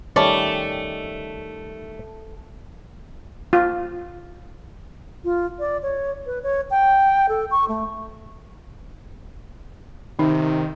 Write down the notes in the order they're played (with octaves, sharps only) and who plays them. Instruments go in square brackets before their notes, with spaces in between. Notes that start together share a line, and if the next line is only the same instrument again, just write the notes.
[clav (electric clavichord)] D#3 G3 C#4 [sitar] A3 [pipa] A4 C#5 D5
[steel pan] F4
[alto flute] F4
D5
C#5
B4
C#5
G5
A4
C#6
A3
[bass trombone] C3 [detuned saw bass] D#3 [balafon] D#4